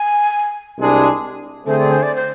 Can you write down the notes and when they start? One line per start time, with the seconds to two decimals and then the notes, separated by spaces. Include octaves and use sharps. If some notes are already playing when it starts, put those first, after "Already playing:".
Already playing: G#5
0.77 C2 C3 G#3 D4 G#4
1.66 D3 A3 C4 G#4 C5
1.79 D5
1.91 C5
2.02 D5
2.16 C5